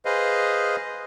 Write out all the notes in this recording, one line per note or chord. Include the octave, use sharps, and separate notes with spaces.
G#4 B4 C5 D#5 F5